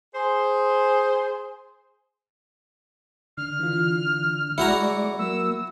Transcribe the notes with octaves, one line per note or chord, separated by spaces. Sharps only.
G#4 C5
D3 F6
E3 F4
G#3 E4 F#4 D5 A#5 C#7
F#3 A#3 E6